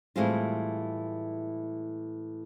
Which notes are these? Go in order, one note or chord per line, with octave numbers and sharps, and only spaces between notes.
A2 E3 G3 G#3 C4 F4